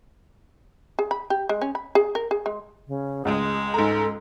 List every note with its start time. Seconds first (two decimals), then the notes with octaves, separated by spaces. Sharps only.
0.99 G#4
1.11 B5
1.30 G4
1.49 G#3
1.62 C#4
1.75 B5
1.95 G#4
2.15 A#4
2.31 G#4
2.46 G#3
2.88 C#3
3.25 C#2 G#3 G#4
3.74 G#2 A4 A#5